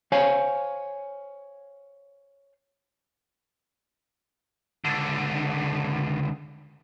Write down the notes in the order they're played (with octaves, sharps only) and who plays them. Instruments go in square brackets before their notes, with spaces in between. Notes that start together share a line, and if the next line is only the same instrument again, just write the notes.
[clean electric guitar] C5 C#5 F5 G#5
[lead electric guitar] C#2 D3